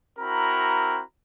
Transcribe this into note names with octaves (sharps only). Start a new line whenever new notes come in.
C4 E4 F#4 A#4 A#5 B5